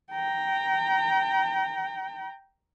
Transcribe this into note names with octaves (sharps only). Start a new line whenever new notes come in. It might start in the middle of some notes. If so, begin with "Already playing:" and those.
G5 A#5